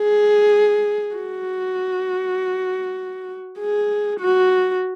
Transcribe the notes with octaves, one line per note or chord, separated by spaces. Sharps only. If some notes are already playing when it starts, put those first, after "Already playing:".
Already playing: G#4
F#4
G#4
F#4